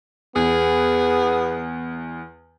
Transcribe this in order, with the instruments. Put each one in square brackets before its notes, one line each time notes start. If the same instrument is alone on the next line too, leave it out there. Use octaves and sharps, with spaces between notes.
[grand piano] E2 [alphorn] B3 [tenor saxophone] G#4